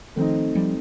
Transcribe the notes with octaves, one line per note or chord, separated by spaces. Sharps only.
D#3 F3 A3 C4 D#4
F3 G3